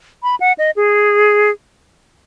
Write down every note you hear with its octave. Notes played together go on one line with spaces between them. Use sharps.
B5
F#5
D#5
G#4